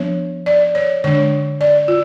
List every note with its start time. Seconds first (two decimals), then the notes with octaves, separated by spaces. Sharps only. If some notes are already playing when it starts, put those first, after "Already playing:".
Already playing: F3 B3 D4 C#5
0.46 D5
0.75 C#5
1.04 D3 G#3 D4 C#5
1.61 D5
1.88 F4